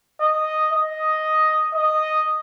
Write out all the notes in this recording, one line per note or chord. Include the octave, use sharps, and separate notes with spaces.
D#5
D#5
D#5